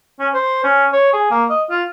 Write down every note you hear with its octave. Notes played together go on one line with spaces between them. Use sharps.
C#4
C5
C#4
C#5
G#4
A#3
D#5
F4